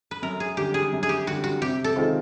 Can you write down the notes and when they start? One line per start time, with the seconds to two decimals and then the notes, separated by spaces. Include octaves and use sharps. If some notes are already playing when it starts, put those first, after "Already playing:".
0.11 B4
0.22 F#2 A#4
0.40 G#4
0.57 D3 G3 G4
0.74 G#4
0.93 F#2
1.03 G#4
1.09 G4
1.27 D3 G3 F#4
1.44 F#4
1.61 C3 G4
1.84 A4
1.96 D#3 G#3 C4 F4